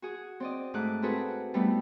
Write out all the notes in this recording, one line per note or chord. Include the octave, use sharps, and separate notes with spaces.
F#4 G#4
C4 D5 D#5
G#2 A3 D6 F#6
C4 E4 F#4 G#4 A4 B4
G3 A3 B3 D#4 E4